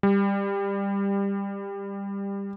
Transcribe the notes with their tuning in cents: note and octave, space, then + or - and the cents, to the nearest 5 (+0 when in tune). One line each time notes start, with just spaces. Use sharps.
G3 +20